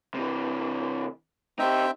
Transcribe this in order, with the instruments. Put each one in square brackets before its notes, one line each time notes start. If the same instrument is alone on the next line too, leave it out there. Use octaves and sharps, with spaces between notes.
[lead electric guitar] C3 E3
[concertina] C4 E5 G5 [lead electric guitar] D#4 G4